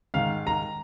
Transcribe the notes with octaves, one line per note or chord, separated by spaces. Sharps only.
G#2 D#3 F5
A#5